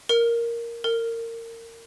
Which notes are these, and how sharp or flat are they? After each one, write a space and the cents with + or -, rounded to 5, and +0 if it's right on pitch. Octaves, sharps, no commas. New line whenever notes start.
A#4 +0
A#4 -25